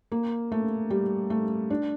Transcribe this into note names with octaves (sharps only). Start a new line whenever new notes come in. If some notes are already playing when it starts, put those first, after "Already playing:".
A#3
A3
G3
A3
D4